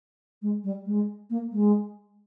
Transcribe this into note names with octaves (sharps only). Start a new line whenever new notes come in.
G#3
G3
G#3
A#3
G#3